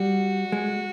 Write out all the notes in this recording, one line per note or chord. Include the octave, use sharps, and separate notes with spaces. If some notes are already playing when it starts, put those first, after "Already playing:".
Already playing: G3 F#4
G#3